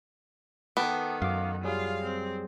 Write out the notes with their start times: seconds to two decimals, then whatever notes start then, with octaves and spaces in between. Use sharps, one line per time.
0.77 D#3 B3 A4 G5 A5 D6
1.22 F#2 F5 D6
1.64 F#3 G3 F4 G#4 F5
2.04 C4